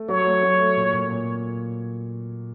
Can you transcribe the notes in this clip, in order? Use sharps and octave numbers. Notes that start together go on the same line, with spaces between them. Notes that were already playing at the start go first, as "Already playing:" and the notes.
Already playing: A3
F#3 C#5
A3
F#3
A3
A#2
A#2
A#2